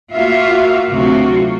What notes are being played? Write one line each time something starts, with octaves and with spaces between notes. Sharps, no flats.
A#3 F4 F#4 E5 F5
D2 C3 F#3 F4 F#4